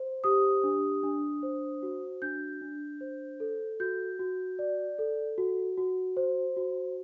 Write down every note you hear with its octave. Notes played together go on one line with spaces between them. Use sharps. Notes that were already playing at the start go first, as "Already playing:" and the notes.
Already playing: C5
G4 D#6
D4
D4
C5
F#4
D4 G6
D4
C5
A4
F#4 G6
F#4
D5
A4
F#4
F#4
C5
F#4